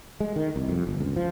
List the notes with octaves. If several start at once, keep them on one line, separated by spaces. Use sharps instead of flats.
G#3
D#3
C2
F2
G1
C#2
F3